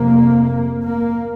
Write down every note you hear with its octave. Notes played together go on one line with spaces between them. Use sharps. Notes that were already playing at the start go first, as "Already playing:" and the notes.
Already playing: F1 F2 C3 A#3
A#3